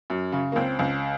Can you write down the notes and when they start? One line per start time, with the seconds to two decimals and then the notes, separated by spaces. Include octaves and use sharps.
0.10 F#2
0.32 C#3
0.52 A#3
0.56 C#2 C4
0.79 C#2